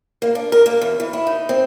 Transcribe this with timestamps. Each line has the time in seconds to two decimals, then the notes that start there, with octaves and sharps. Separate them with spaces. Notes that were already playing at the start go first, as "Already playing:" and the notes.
0.22 A#3
0.35 D4
0.52 A#4
0.66 A#3
0.82 E2
1.00 E3
1.13 E4
1.27 D#4
1.49 C4